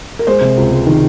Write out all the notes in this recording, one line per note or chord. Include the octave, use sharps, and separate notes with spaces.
A#4
G#3 C5
C3
C#2
G#3
D#3